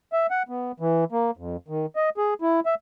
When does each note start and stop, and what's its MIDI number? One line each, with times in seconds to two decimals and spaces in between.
0.13 0.27 76
0.31 0.43 78
0.49 0.72 59
0.80 1.04 52
1.12 1.31 58
1.37 1.56 41
1.68 1.86 51
1.96 2.10 75
2.17 2.34 68
2.42 2.60 64
2.66 2.75 76